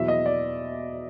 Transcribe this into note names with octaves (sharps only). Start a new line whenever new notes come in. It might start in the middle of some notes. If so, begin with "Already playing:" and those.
Already playing: E2 B2 F#3 E5
D#5
D5